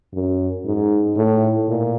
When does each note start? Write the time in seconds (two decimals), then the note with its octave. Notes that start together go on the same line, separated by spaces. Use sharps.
0.13 F#2
0.65 G#2
1.17 A2
1.69 A#2